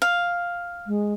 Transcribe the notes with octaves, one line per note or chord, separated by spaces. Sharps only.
F5
G#3